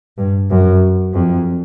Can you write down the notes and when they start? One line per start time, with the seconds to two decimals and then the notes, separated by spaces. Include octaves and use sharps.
0.18 G2
0.50 F#2
1.14 F2